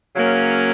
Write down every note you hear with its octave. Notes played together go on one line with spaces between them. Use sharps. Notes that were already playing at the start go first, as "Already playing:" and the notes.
C#3 F#3 A#3 C#4